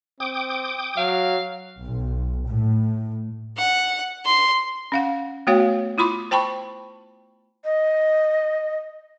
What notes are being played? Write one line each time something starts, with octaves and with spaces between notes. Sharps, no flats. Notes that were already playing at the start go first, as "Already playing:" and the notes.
C4 G5 D6 D#6
F#3 F5
B1
A2
F#5
C6
C#4 F5 F#5
A3 B3 F#4 C#5 F5 G5
E4 F4 B5 C6 D6
C5 G5 A5 B5 C#6
D#5